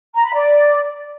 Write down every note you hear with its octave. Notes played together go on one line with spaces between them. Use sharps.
A#5
B5
D5